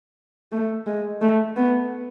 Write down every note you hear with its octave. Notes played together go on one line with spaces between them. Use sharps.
A3
G#3
A3
B3